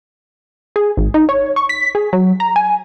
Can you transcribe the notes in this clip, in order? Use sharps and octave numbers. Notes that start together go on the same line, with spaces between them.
G#4
G#1
D#4
C#5
C#6
B6
G#4
F#3
A#5
G#5